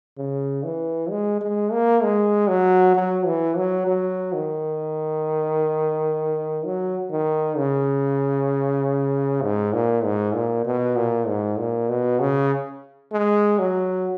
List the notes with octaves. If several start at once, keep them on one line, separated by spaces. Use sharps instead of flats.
C#3
E3
G#3
G#3
A#3
G#3
F#3
F#3
E3
F#3
F#3
D#3
F#3
D#3
C#3
G#2
A#2
G#2
A#2
B2
A#2
G#2
A#2
B2
C#3
G#3
F#3